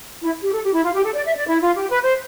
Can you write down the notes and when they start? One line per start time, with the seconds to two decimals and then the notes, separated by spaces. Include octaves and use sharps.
0.23 E4
0.43 G4
0.53 A4
0.64 G4
0.74 E4
0.84 F4
0.94 G4
1.05 A4
1.15 D5
1.25 E5
1.35 D5
1.49 E4
1.62 F4
1.76 G4
1.90 B4
2.03 C5